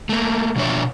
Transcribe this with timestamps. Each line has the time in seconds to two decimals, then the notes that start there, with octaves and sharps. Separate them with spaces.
0.09 A3 A#3
0.56 B2 F3 D4 F#4 C#5 E5